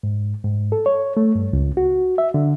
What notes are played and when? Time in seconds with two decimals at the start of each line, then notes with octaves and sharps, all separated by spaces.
0.03 G#2
0.44 G#2
0.72 A4
0.86 C#5
1.17 A3
1.35 G2
1.53 C#2
1.77 F#4
2.18 E5
2.34 D3